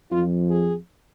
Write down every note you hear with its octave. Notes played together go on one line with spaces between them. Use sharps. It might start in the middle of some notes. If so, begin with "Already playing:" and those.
F2 F3 F4
G#4